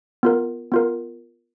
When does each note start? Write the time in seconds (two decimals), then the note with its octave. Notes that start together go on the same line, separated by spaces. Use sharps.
0.23 B3 F4 A#4
0.72 B3 F4 A#4